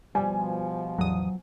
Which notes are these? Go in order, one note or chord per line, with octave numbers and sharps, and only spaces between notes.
B2 F3 G3 G#5
A1 E2 F#3 D#6